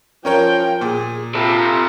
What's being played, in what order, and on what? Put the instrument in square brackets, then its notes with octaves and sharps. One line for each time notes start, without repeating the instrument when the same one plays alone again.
[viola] F3 G5 [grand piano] C#4 A#4 C#5
[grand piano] A#2 [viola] G#4
[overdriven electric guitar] C3 [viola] F4 [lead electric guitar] A4 B4